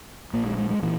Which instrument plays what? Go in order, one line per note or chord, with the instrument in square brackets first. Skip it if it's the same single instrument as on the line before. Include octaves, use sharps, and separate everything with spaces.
[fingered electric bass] A#1 A#2 A#3
G#3
G#3
G#3
A#2 E3